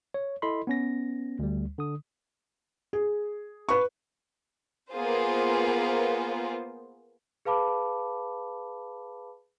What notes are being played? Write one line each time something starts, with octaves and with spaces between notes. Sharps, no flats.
C#5
E4 A4 D#5 B5 C6
B3 C#4 A#6
D2 G3
D3 D#6
G#4
B4 C#6
A#3 B3 F4 G#4 A#4 C5
G#4 B4 F5 A5 B5 D6